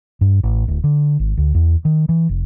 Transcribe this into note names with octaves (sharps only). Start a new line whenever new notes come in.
G2
A1
D1
D3
G#1
D2
E2
D#3
E3
F1